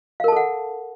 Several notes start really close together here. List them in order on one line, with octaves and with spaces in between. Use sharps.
F5 A#4 A5 A4 F#5